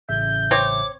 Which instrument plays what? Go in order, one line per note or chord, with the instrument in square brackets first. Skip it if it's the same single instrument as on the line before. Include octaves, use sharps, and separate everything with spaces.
[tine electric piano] A1 C#3 E5 [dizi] G6
[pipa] C4 C#5 [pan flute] D6